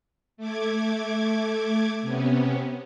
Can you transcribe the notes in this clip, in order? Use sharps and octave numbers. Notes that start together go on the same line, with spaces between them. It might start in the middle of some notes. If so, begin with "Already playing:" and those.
A3 D6 G#6
C3 B3 C#4